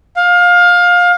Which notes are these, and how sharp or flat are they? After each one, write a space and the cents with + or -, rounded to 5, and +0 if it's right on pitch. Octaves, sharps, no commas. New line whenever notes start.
F5 +20